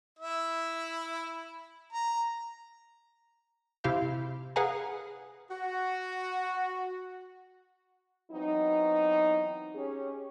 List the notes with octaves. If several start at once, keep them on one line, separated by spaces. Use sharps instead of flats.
E4 E5
A#5
C3 E4 G4 F5 G6
G#4 B4 F5 F#5 G#5 A#5
F#4
E3 F#3 B3 C4 D#4
C#4 G4 G#4